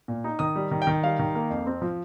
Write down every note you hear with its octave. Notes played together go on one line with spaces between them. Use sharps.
A#2
D#4
D#3 D#6
G3
D#3
G5
D#3
G3 F5
D#3
A#3
F2
C4
F3